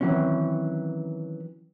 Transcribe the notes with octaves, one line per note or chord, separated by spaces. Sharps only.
D#3 E3 F#3 C4 C#4